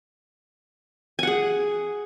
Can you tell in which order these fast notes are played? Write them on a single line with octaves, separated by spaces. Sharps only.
G#5 F#5 G#4